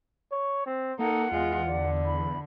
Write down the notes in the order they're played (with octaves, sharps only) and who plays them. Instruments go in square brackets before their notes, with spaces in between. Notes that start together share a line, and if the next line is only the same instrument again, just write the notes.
[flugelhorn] C#5
C4
[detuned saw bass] A#3 [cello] D#4 [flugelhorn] A4 [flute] F#5
[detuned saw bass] E2 [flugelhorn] G#3 [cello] F4
[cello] D3 [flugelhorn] D5
[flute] B5